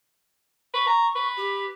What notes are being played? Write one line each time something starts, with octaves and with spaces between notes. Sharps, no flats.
B4 C#6
A#5
B4
G4